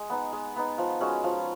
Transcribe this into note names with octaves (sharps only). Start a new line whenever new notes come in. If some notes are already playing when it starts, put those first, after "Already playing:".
Already playing: G#3
B3 D#4
G#3
B3 D#4
F3
G#3 C#4 F#4
F3